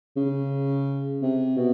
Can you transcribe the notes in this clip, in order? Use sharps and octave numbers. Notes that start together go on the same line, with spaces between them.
C#3
C3
B2